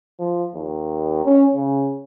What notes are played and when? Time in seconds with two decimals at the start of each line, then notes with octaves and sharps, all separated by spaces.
0.19 F3
0.55 D#2
1.25 C#4
1.54 C#3